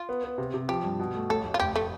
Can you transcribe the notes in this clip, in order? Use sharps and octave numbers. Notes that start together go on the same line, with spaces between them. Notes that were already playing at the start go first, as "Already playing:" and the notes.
Already playing: F4
B3
B3
C3
C3
F3 G4
G2
B2
A3
A1 A4
A1
F4
F1 G4
A3